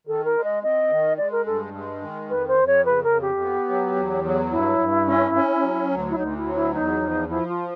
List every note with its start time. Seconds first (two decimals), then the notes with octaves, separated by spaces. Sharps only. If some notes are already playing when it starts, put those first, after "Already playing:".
0.07 D#3 A4
0.25 A#4
0.35 G#3
0.44 D#5
0.63 C4 D#5
0.90 D#3
1.17 G#3 D5
1.32 A#4
1.46 G2 A4
1.74 G#3
2.02 D#3
2.29 F2 B4
2.48 C5
2.58 F2
2.67 C#5
2.85 C#3 B4
3.04 A#4
3.12 F2
3.21 G4
3.40 B3
3.68 F#3
3.96 E2
4.24 F#3
4.51 G2 E4
4.79 G2
5.07 C#4
5.35 C#4
5.63 F#3
5.91 D2
6.10 E4
6.18 D2 D#4
6.37 E4
6.46 F#3
6.55 E4
6.74 E2 D#4
7.02 F3
7.29 F3 E4
7.48 F4